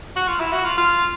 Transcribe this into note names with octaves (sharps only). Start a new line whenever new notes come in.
F#4
F4
E4
F#4
F4
F4